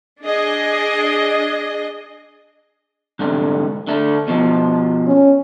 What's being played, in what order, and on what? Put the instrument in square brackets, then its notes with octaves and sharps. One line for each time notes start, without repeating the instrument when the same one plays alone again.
[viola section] D4 G#4 D#5
[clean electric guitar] C2 G#2 D3
D3 A3
B2 F3
[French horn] C#4